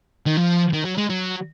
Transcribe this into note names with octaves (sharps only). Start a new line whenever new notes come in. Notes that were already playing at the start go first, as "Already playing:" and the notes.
D#3
F3
D#3
F#3
G#3
F#3